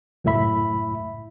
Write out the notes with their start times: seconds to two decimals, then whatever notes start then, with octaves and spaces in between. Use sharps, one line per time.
0.24 C#2 F#2 A2 E4 E5 B5